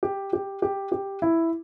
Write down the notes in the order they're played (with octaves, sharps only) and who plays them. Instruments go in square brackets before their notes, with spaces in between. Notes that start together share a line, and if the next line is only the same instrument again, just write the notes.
[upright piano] G4
G4
G4
G4
E4